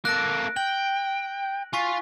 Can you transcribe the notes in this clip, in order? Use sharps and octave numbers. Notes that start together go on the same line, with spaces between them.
A#3 A4 F#6 A#6 D7
G5 F#7
F4 G#5 C#6 B6